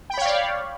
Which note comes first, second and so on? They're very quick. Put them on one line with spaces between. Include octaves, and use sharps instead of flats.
G5 B5 C#5 F5 D5